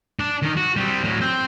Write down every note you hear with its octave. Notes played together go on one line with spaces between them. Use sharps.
D4
D#3 A#4
F#4
G3 C4
A2 F#3
C4